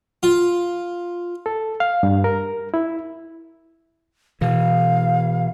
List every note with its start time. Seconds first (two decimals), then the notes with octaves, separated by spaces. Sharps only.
0.23 F4
1.46 A4
1.80 F5
2.03 G2
2.24 A#4
2.74 E4
4.41 B2 E3 F5